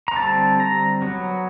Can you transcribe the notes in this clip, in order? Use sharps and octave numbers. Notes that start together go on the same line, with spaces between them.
A#5
D3 G3 C4 A5
A#5
F#3 B3